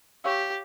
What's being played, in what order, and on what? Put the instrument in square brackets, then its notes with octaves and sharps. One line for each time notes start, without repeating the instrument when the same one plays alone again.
[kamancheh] G4 [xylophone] C#5 F5 C#6 E6